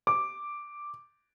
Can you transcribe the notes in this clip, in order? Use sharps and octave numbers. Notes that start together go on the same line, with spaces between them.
D6